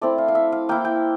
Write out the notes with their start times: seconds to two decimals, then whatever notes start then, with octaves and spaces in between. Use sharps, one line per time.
0.01 A3 C4 E4 D5
0.18 F5
0.28 F5
0.35 E5
0.52 F5
0.69 A#3 E4 G5
0.85 G5